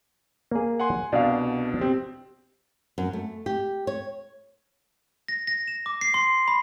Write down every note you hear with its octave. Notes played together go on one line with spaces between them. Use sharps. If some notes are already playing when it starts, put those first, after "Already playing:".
A#3 G#4
F#5 G#5 C6
C2 B2 D4 D5 F5
C4 G4
F#2
A3
G4
C#5
A#6
A#6
E7
D6
C7
C6
B5